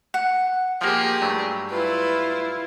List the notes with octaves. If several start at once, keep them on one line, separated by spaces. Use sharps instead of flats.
F#5
F3 A#3 G4 G#4
G2 F#3 A3
E4 F4 B4